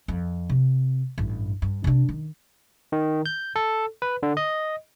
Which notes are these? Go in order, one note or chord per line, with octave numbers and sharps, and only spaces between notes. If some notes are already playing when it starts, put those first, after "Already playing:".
F2
C3
A1 G2
G2
C3 D4
D#3
D#3
G6
A4
B4
D3
D#5